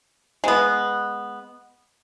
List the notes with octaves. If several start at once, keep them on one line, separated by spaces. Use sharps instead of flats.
G#3 B3